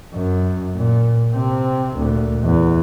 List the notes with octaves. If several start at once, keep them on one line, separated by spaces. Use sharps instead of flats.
F#2
A#2
C3 C4
D2 A#2
E2